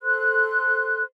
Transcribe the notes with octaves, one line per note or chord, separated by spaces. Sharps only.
A4 C5 C6 F#6